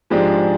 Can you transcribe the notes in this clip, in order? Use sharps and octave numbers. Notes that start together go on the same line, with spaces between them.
G#2 F3 G#3 D4 G4